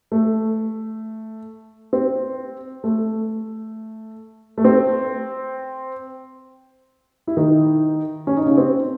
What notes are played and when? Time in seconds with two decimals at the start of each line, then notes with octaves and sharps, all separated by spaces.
0.12 A3
1.93 C4
2.84 A3
4.58 A3
4.64 C4
7.27 E4
7.37 D#3 D#4
8.27 C#4
8.37 D#4
8.46 C#3 C#4
8.57 C4